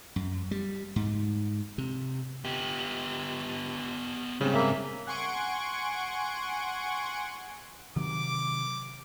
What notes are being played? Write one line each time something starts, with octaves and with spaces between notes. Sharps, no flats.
F#2
G3
G#2
C3
B3 G4
G#2 C#3 G3 C4
A#3 E5
F#5 G#5 C6 C#6 D7
C3 D#3 F#3 D6